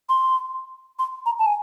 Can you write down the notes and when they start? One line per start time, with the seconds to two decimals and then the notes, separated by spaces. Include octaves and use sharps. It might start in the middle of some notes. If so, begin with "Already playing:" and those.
0.09 C6
0.99 C6
1.26 A#5
1.39 A5
1.46 G#5